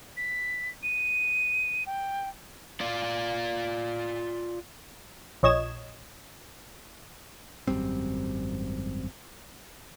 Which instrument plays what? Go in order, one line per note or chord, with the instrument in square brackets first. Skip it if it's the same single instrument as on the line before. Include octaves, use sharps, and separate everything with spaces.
[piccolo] B6
D#7
G5
[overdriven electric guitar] F4 D5
[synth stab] A#1 C#5 D#5 G#6 E7
[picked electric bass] G#1 F#2 G3 C4